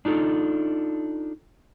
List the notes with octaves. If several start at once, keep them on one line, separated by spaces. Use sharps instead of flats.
D4 D#4 F4 A4